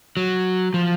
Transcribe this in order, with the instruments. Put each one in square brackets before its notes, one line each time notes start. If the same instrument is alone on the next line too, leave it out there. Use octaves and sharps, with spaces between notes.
[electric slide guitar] F#3
F3